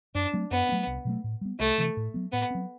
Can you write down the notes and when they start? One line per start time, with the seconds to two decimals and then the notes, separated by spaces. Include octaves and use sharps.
0.15 F#2 D4
0.33 F#3 A3 C4
0.51 F#2 B3
0.69 C4
0.72 F#3 A3
0.87 C2
1.05 B2 F#3 A3
1.24 A2
1.41 G3 B3
1.60 C2 A3
1.78 C3 E3
1.97 A2
2.14 F#3 B3
2.32 A2 B3
2.51 F#3 C4